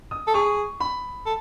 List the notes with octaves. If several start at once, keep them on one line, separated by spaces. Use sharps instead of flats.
D#6
A4
G#4 C#6
B5
A4